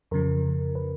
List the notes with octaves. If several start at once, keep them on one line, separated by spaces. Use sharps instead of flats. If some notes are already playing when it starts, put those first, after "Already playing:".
F2 C#3 F3 A#4
B4